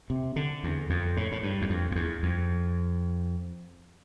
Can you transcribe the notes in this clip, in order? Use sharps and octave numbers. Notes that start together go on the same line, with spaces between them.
C3
D3
E2
F2
A2
A2
G2
E2
F2
F2
E2
F2